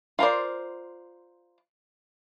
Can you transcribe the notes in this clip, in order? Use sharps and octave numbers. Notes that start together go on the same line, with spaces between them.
F4 A#4 C5 D5